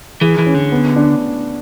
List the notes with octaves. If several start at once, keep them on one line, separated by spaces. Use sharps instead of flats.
E3 G#4
E3
C#4
D3
B3
D4